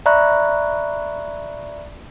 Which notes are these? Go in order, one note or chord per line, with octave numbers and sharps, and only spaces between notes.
D5 E5 A#5 B5 C#6 F#6